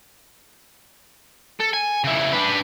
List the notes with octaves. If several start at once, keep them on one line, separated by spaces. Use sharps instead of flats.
A4
G#5
C#3 E4
D4 B4